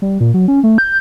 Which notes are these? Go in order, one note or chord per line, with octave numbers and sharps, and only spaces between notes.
G3
A#2
F#3
C#4
A3
G6